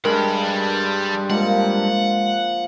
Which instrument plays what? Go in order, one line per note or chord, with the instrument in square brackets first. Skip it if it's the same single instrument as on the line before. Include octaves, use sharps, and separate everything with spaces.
[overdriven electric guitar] G2 [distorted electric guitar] G3 B5 [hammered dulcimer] G#3 [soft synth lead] A#4
[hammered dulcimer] F3 A#3 [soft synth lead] G#3 [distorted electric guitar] F#5